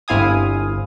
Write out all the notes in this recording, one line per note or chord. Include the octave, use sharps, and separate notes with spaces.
G1 C4 E4 F5 G#5 D#6